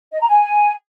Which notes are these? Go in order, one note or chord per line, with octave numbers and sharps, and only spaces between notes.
D#5
A#5
G#5